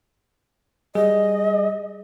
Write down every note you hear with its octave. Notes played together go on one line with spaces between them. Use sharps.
G3 G#4 D#5